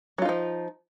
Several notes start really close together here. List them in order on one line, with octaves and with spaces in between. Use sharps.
F#3 F4 D#4 F3